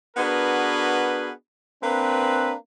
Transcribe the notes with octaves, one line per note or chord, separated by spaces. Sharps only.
B3 D4 F#4 G#4 A#4 B4
A#3 C4 D4 B4